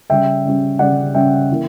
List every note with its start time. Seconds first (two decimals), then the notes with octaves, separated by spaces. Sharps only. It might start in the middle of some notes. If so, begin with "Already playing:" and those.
0.10 C#3 G3 C#4 E5 G5
0.45 C#3 G3 C#4
0.79 C#3 G3 C#4 D5 F#5
1.14 C#3 G3 C#4 E5 G5
1.51 E3 A#3